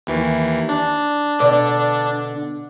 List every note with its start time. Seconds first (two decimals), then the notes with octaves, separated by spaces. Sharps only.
0.07 D#2 E3
0.69 D4
1.39 B2 D3 D5